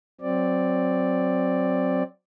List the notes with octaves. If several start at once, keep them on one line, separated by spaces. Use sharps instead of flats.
F#3 C4 D5